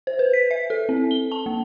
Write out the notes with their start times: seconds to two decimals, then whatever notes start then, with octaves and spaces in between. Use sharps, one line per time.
0.07 C5
0.19 B4
0.33 B6
0.51 E5
0.70 A4
0.89 C4
1.11 G7
1.32 A5
1.46 A#3